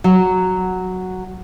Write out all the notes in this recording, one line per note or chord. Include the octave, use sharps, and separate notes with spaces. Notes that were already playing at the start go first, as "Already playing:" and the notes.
F#3